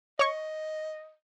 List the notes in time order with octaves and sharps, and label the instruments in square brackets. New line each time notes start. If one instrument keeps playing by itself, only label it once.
[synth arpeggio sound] C#5 C#6 [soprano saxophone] D#5